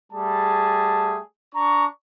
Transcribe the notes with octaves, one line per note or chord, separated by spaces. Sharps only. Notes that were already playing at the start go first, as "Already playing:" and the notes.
G3 A3 G#4 A5
D4 A#5 C#6